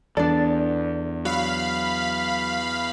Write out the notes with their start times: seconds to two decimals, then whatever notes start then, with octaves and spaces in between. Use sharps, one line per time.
0.17 E2 D4 A4 D5
1.25 F#3 F5 B5